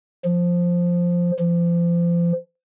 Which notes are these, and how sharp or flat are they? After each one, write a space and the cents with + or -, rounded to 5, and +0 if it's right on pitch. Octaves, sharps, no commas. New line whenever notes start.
F3 +5
F3 -30